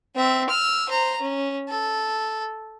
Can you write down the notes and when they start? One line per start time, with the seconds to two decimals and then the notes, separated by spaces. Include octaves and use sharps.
0.16 C4 E5
0.50 E6 F6
0.89 C5 A#5
1.21 C#4
1.69 A4